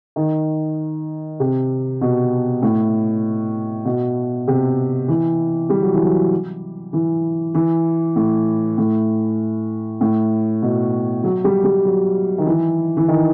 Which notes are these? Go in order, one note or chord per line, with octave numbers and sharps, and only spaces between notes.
D#3
C3
B2
A2
B2
C3
E3
G3
F#3
E3
F#3
E3
E3
A2
A2
A2
B2
F#3
G3
G3
F#3
D#3
E3
E3
D#3